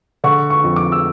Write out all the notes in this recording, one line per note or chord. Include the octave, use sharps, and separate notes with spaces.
D3 C#6
C#6
F2
D6
E6